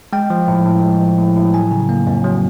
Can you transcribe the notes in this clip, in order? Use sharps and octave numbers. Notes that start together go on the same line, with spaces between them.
G#3 G5
F3
A2
A2
G#3
F3
A2
A2
F#3 G#5
C#3
A#3
F2
F#3